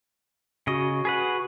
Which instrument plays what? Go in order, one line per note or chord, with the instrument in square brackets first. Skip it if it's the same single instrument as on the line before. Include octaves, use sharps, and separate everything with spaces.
[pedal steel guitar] C#3 D#5 [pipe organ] F#4
[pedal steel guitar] G#4 B4 F#5